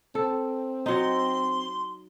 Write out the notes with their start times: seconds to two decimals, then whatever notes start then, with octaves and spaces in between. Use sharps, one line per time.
0.15 C4 A4
0.86 F#3 D#4 C6